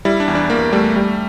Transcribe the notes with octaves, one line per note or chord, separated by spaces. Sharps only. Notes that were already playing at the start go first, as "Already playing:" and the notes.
G3 E4
D4
E2
D4
E2 A#3
G3 A3
G3